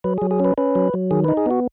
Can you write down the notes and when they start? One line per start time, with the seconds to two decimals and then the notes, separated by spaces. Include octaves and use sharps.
0.04 F#3 B4
0.18 F#3 G#4
0.31 G#4
0.40 C#4 B4
0.58 C#4 B4
0.75 F#3
0.94 F#3
1.11 D#3 G#4
1.24 D#4 B4
1.37 G#4
1.46 B3 F#4